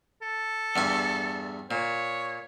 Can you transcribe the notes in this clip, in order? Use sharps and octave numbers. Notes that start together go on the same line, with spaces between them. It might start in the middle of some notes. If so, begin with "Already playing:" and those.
A4
E2 G2 G#5
A#2 C#5